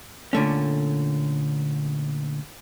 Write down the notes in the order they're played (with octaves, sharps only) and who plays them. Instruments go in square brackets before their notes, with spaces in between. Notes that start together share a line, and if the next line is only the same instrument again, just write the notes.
[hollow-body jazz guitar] A#2 D3 A3 C#4